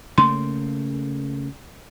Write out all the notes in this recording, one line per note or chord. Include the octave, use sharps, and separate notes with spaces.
C#3 A3 A#3 C6